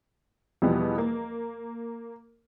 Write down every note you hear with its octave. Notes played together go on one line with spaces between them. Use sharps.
E2 B2 F3 G3 B3
A#3